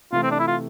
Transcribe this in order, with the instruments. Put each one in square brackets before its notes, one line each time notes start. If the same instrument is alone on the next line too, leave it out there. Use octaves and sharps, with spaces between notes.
[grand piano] C3 E3 A3 [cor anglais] F4
[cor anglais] C4
D4
E4
F4